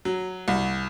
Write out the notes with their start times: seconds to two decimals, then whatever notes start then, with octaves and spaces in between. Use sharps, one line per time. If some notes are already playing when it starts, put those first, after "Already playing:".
0.05 F#3
0.48 C2